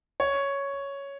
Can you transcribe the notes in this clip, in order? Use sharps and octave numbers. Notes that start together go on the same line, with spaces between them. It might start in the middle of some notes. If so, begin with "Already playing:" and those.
C#5